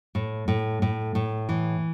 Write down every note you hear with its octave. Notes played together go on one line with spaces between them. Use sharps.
A2
A2
A2
A2
E3